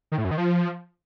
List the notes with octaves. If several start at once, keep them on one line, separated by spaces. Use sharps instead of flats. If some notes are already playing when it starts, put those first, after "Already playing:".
D#3
A2
F#2
D#3
F3